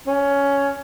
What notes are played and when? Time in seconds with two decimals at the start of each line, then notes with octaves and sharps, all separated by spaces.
0.07 C#4